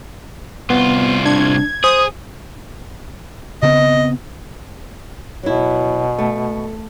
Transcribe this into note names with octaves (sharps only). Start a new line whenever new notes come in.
C2 B3 F4
D4 G#6
G#4 C5 D#6
C#3 B3 C4 D#5
B2 F#3 E4
A3